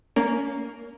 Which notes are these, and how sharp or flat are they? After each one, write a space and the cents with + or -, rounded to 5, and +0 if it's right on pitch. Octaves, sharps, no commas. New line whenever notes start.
A#3 +0 C#4 +25